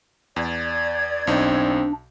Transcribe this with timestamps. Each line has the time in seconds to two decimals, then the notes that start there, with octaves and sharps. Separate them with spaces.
0.36 E2 D5 G#6
1.27 B1 C4 D4 D#4